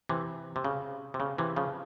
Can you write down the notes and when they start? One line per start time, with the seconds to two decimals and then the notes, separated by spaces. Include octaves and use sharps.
0.09 C3 E3
0.56 C3
0.64 C#3
1.14 C3
1.20 C#3
1.38 C3 E3
1.56 C#3 F3